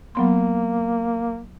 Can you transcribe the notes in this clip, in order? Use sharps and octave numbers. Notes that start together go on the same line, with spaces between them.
F#3 A#3 B3 C6